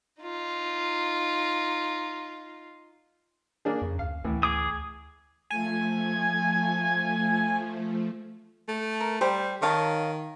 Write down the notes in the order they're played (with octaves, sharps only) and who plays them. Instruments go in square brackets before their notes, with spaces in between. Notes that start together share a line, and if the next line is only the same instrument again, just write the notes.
[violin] D#4 F4
[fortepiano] A#3 D4 G#4
[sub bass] F2 [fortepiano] C#3
[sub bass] D2 [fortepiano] F5
[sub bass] D2 [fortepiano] A2 E3
[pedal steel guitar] G#4 D6 D#6
[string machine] F3 A3 [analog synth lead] G#5
[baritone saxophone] A3
[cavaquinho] A#4
[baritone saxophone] G3 [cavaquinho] G4 C5
[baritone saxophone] D#3 [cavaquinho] C#5 F5 A5